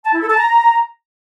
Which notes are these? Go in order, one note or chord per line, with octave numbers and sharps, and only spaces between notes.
A5
E4
A4
A5
A#5